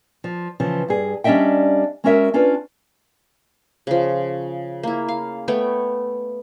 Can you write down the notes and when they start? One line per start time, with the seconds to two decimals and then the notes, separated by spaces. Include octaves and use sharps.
0.24 F3
0.60 C#3 E3 F3
0.88 G2 G#4
1.24 G3 C#4 D4 D#5 E5 G5
2.04 G#3 C#4 F#4 A#4 C#5 E5
2.34 C#4 D4 F4 B4
3.87 C#3 F3
4.83 A#3 E4
5.08 F5
5.48 A3 B3 C#5 G5